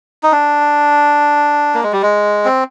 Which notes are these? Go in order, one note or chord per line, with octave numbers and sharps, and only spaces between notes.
D#4
D4
A#3
G#3
G3
G#3
C4